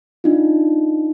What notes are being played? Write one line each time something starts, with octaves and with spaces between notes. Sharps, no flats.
D4 D#4 F4